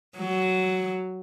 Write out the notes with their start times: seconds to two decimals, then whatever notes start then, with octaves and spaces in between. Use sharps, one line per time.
0.17 F#3